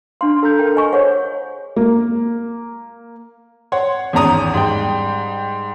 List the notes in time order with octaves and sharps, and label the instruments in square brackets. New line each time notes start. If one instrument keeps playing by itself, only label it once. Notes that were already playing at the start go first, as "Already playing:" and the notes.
[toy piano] D4 C6 [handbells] F5
[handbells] A4 A#5 G6
[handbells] A#4 F5 [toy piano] G5
[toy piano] D#5 G#5 C#6
[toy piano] G#4 C#5 F#5 [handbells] C5
[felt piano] A#3
[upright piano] C#5 F#5 C6
G#1 E2 C#4 A#5 D#6
G#2 G3 G5